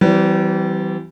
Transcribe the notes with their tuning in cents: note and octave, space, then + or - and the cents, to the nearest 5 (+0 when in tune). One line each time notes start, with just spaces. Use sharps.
E3 +0 G3 -35 C4 -30